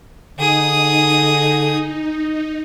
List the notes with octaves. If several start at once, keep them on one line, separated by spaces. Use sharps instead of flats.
D3 D#4 G#4 D#6